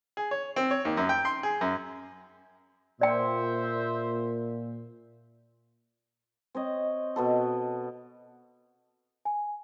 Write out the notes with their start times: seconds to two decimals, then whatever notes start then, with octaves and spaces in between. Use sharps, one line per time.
0.17 G#4
0.31 C#5
0.56 C4
0.71 C#5
0.85 D#2
0.97 F#2
1.09 G5
1.25 C6
1.43 G#4
1.61 F#2
3.01 A#2 C5 D5 E5 G5
6.55 C4 C#5 D#5
7.16 B2 B3 A4
9.25 G#5